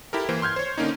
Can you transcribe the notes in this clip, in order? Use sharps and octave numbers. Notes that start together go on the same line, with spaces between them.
E4 G4 A4 A#4
E3 A#3 C5
C6 F6 G6 G#6
C5 C#5
D3 A#3 C#4 D#4